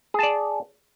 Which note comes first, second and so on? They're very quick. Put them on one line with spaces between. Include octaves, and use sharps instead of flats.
G#4 A5 D5